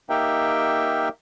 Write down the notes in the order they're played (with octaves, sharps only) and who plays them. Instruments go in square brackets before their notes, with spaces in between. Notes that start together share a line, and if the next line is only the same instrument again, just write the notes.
[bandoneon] A#3 D#4 G4 A#4 E5 G5